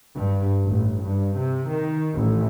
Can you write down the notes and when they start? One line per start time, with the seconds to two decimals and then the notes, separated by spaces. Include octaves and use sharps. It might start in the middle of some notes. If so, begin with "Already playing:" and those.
0.15 G2
0.65 A1
1.00 G2
1.36 C3
1.70 D#3
2.15 A1